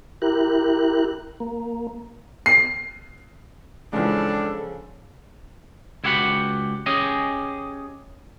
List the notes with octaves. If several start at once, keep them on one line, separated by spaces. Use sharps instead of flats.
E4 G4 A#4 F#6
A#3
C7
C#2 C#3 E3 F3 G#3 D4 A4
C#2 E4 F#4 G4 F#5 B5
C#4 G4 G#4 D#5